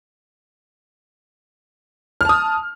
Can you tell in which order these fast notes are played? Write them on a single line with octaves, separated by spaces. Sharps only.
F6 A5 D#6